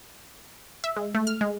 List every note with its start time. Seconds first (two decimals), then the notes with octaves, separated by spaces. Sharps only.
0.84 E5
0.96 G#3
1.14 A3
1.27 F6
1.41 G#3